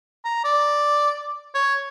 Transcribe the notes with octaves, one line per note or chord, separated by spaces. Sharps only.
A#5
D5
C#5